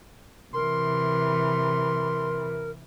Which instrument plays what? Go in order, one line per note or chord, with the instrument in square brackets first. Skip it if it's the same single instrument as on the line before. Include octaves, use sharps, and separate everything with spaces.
[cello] C3 E3 [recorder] A#4 [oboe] C6